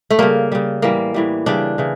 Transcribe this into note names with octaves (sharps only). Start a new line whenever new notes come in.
A3
C#3 G3 A#3
C#3 G3
A2 E3 G3 A#3
A2 E3 G3
C#3 E3 G3 D4
C#3 E3